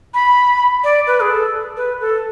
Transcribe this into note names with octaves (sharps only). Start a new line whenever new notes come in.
B5
D5
B4
G#4
A4
B4
A4